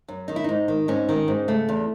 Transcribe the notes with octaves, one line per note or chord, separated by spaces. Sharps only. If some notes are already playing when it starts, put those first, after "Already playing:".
F#2
D#3 D#4
E4
G#2 D#4
D#3
G#2 C#4
D#3
G#2
C#3 A3
E2